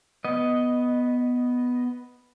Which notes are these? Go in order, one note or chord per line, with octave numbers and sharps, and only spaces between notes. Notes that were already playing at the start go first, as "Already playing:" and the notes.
B3 D#5